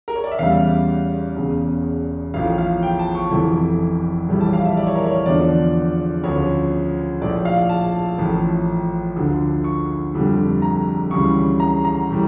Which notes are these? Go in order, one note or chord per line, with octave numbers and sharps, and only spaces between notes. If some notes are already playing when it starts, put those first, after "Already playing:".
A#4
C#5
D5
E5
E2 C#3 G3 F5
E1 E2 C#3
A1 A2 F3 F5
F5
G5
A5
C#6
F1 F2 E3
A#1 A2 E3 G3
A5
F5
E5
D5
C#5
A#4
C#5
E2 D3 F3 D5
D2 C#3 F3 C#5
A#1 A2 F3 D5
F5
A5
A1 A2 F3
D2 D3 F3
C#6
F1 F2 D3 G3
A#5
D2 C#3 E3 G3 C#6
A#5
A#5
A2 E3 G3